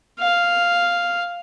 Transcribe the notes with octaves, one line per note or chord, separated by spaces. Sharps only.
F5